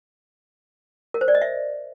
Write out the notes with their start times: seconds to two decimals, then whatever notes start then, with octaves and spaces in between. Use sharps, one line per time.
1.14 A#4
1.21 C5
1.28 D5
1.35 D#5
1.42 E5